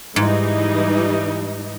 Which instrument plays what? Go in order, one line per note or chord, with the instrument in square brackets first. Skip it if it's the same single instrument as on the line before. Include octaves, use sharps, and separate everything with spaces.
[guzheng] G#2 [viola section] E3 G3 D#4